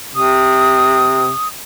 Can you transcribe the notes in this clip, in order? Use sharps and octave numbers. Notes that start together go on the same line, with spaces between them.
C3 D#6